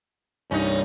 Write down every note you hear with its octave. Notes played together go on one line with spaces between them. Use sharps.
C2 G2 C#4 D#4